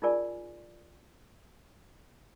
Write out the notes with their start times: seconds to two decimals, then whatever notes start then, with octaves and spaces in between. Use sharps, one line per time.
0.02 D#4 F4 G#4 A#4 D5 G#5